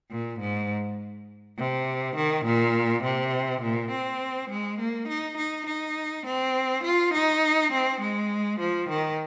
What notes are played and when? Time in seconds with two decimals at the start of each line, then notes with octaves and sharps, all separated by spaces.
0.11 A#2
0.40 G#2
1.58 C3
2.16 D#3
2.46 A#2
3.03 C3
3.62 A#2
3.91 C4
4.50 G#3
4.79 A#3
5.08 D#4
5.37 D#4
5.67 D#4
6.26 C4
6.84 F4
7.14 D#4
7.73 C4
8.01 G#3
8.60 F3
8.89 D#3